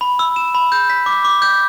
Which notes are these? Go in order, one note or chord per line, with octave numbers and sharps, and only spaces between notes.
B5
E6
E7
B5
G6
B6
D6
D6
G6